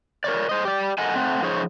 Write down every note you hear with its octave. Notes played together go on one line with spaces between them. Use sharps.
A#4 C#5 D5
C5 D#5
G4 D5
A4 A#4 D#5 F#5 G#5
A3 C4 F#5
F3 C#4 D#4 G#4 C5 C#5